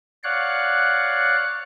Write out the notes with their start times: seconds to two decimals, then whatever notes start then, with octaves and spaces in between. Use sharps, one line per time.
0.24 C#5 D5 F5 F#5 F#6